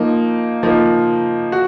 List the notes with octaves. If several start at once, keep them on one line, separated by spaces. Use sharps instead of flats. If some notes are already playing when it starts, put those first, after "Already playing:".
Already playing: F3 A#3 D#4
F3 A#3 D#4
F#4